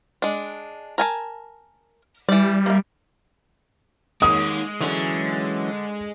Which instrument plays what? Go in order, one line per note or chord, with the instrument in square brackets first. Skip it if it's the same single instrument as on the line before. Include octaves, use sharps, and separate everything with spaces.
[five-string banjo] G#3 D4
A#4 G#5 A5
[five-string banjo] E3 D5 [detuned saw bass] G3
[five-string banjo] A#3 E5
[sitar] D#2 A#3 [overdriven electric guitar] G#3 [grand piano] D#6
[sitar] D3 [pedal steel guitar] E3 F#3 C#4